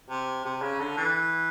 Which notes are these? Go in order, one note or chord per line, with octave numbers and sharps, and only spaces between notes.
C3
C3
C#3
D3
E3